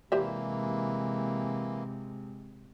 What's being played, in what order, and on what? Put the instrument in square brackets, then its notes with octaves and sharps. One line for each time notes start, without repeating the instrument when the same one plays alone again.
[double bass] C3 G#3 [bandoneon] E3 A#3 [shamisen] G4 C5 E5